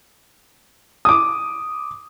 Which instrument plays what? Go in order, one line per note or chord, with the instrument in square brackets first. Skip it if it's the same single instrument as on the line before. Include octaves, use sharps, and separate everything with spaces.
[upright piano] D6 D#6